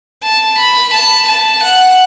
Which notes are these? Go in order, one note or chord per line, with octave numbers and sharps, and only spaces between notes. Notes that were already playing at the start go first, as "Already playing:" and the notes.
A5
B5
A5
A5
F#5